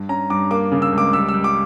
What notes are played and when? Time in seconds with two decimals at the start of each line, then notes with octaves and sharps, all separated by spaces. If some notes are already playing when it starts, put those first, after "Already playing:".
Already playing: G2
0.09 C#4 A#5
0.30 G2 D6
0.51 A#3 D6
0.72 C#3
0.82 E6
0.93 C#2
0.98 D6
1.13 G3 E6
1.29 E6
1.34 G3
1.44 D6